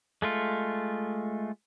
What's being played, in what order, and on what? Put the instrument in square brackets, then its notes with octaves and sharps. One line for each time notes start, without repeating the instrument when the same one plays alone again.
[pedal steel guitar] G#3 A3 F4